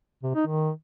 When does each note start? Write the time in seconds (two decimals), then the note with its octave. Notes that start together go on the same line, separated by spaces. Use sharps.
0.23 C3
0.35 D#4
0.47 D#3